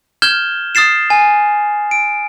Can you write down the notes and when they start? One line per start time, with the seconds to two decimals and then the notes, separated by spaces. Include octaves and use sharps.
0.22 F6 G6 G#6 E7 G7
0.75 D#6 F6 A6 C7 E7
1.10 G#5
1.91 D7